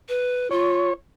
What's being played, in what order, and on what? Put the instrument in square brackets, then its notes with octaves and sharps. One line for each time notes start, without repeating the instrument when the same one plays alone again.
[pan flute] B4
[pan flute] F4 [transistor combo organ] C#5